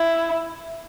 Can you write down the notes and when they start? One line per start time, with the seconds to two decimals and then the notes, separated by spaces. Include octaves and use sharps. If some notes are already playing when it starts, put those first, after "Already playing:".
Already playing: E4